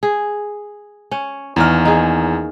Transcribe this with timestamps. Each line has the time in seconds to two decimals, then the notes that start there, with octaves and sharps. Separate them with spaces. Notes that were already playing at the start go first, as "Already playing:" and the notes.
0.03 G#4
1.11 C#4
1.56 E2 D#3 A#3 C#4 F6
1.85 D#4 G#4